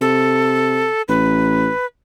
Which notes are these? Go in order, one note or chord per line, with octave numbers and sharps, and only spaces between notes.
C3 A4
A1 B4